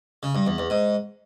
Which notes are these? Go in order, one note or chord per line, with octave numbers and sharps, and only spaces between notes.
C#3
G2
E2
E2
G#2